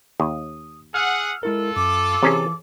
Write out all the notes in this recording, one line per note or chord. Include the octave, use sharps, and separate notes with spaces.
D#2 D#6
G#4 F#5 E6 F6
G#3 E4 F4 A4 A#4
F#2 D6
C3 E3 C#4 G#4